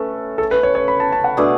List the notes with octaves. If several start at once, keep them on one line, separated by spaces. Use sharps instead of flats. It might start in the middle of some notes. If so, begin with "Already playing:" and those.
Already playing: A3 C#4 A4 B4
A4
B4
C#5
C#5
B5
A5
A5
F#5
B2 A3 D4 G#4